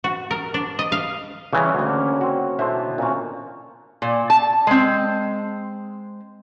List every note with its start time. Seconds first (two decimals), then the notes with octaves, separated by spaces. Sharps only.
0.04 F#4
0.31 A#4
0.54 D4
0.79 D#5
0.92 F5
1.53 C#3 E3 G3 C#4 C6
1.75 D2 C#3 A#3
2.21 C4 F#4
2.59 B2 D3 E3 C5 E5
2.98 A#2 C4 C#4
4.02 A#2
4.30 A5
4.67 G#3 C4